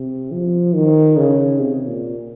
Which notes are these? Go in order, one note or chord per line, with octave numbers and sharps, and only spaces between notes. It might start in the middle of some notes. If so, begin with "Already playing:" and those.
Already playing: C3
F3
D#3
C#3
C3
A#2